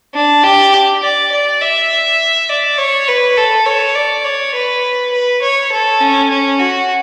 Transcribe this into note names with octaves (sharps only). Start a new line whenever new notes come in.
D4
G4
D5
D5
E5
D5
C#5
B4
A4
C#5
D5
C#5
B4
B4
C#5
A4
C#4
C#4
F#4